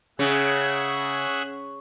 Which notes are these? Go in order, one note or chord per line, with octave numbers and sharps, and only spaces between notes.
C#3 G#4 E5 F#5